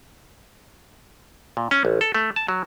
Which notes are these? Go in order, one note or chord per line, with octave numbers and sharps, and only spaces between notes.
A#2
C#4
A1
A4
A3
A5
F#3